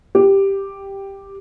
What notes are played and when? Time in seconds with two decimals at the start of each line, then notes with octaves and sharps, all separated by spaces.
0.15 G4